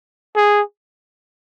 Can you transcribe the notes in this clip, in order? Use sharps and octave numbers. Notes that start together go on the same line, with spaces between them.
G#4